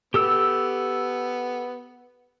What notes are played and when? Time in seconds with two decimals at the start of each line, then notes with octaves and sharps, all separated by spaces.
0.14 B3 G4 A4 E6